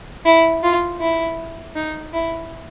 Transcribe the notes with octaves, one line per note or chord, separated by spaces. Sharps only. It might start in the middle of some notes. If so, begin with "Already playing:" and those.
E4
F4
E4
D#4
E4